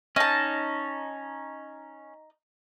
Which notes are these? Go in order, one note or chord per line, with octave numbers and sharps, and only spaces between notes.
C#4 D#4 A5